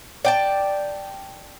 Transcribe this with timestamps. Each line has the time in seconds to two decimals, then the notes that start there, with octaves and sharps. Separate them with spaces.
0.25 D5 G5 A5